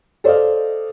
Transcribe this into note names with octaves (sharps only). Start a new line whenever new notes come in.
A4 C5 D5 D#5 F5